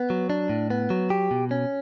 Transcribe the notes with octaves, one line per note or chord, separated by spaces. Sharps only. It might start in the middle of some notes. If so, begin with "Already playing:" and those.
Already playing: B3
F#3
D4
A2
B3
F#3
G4
B2
C#4